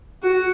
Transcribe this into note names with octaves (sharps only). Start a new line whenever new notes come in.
F#4